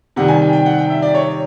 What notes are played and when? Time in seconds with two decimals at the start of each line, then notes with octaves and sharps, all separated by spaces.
0.16 C3 D#3 G3 F#5
0.28 G#5
0.41 G5
0.53 G5
0.66 F#5
0.78 G5
0.90 E5
1.02 D5
1.14 C#5